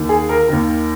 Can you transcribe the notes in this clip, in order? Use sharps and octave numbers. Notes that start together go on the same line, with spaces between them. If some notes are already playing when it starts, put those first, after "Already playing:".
Already playing: D#2 D#3
G#4
A#4
D#2 D#3 A#4